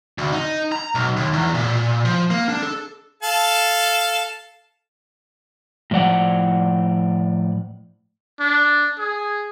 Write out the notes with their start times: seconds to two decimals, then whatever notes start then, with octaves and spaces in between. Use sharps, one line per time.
0.18 D2
0.33 D#4
0.72 A#5
0.95 B1
1.17 D#2
1.33 E2
1.54 A#2
2.05 F3
2.30 A#3
2.49 D4
2.62 A4
3.23 A4 F5 A5
5.91 A2 F3 D5 F#5
8.40 D4
8.99 G#4